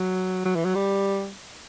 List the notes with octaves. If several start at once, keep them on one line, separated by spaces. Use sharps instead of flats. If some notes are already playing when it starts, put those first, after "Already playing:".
Already playing: F#3
F#3
E3
F#3
G3